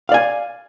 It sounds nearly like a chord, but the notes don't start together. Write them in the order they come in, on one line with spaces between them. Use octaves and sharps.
F5 D5 G#5